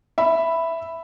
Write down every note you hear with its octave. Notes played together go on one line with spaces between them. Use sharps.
E5 B5